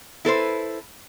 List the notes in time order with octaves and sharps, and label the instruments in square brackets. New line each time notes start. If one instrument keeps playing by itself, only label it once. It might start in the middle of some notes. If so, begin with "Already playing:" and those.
[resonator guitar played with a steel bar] E4 A4 B4 C5